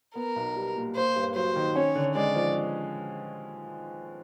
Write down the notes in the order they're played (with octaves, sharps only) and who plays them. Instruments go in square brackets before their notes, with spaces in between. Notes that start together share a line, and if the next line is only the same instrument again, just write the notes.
[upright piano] B3 [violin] A#4
[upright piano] B1
G3
A#2
[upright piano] A#3 [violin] C5
[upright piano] G2
[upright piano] F#3 [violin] C5
[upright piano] D#3
[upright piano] C#4 [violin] C#5
[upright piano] D3
[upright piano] G#3 [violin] D5
[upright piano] F3